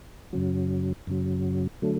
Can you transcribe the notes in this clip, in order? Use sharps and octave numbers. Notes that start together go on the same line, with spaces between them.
F#2 C#3 F#3
F#2 C#3 F#3
D3 F#3 A3